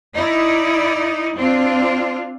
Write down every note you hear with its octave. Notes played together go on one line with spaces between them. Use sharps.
D#4 E4 D5
C4 D4 F4